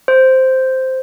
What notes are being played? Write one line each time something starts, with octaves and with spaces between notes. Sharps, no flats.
C5